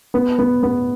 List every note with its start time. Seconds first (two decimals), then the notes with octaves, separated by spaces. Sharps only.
0.14 B3
0.39 B3
0.63 B3